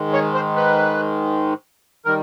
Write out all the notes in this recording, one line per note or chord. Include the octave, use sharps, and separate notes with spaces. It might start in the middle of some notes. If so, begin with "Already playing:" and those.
Already playing: G#2 D#3 G#3
C#5
C5
B4
D#3 G3 A#4